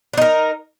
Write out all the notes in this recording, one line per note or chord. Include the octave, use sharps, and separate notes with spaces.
D4 D#4 A#4